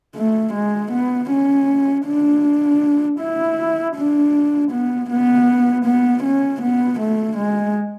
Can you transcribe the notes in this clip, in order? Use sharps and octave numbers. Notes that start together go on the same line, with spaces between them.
A3
G#3
B3
C#4
D4
E4
D4
B3
B3
B3
C#4
B3
A3
G#3